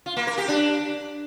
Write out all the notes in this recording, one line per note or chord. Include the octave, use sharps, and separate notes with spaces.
F4
A#3
A#4
G4
D4